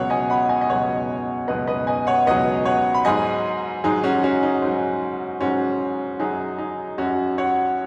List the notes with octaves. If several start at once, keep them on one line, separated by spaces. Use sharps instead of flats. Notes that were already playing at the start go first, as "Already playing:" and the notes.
Already playing: C#2 B2 F#3 C#5 F#5
D#5 G#5
F#5 B5
D#5 G#5
D#5
C#2 B2 F#3 C#5 F#5
C#2 B2 F#3 B4 D#5
B4 D#5
D#5 G#5
C#5 F#5
C#2 B2 F#3 B4 D#5
C#5 F#5
B5
G#2 F#3 D#5 G#5
G#2 F#3 D#4 G#4
C#4 F#4
C#4 F#4
D#4
G#2 F#3
G#2 F#3 C#4 F#4
F#2 F#3 D#4 G#4
D#4
F#2 F#3 C#4 F#4
C#5 F#5